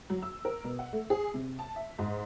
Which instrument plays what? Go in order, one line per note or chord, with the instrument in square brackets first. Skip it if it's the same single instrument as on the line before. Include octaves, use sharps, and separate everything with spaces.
[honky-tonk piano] F#3
E6
A#4
B2
F#5
A3
G#4
C3
A5
E5
G#2